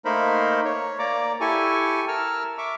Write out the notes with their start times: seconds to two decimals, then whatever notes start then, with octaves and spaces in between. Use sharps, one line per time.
0.05 A3 A#3 D#4 A#4 C5 B5
0.65 C#5
0.99 A#3 D5 A#5 D6
1.41 E4 G4 A4 G#5 C#6
2.08 A#4 A5 E6 F6
2.58 E5 C#6 D6